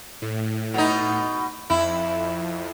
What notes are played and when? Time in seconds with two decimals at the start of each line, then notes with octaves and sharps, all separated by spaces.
0.22 A2
0.74 B2 D#4
1.70 F2 E4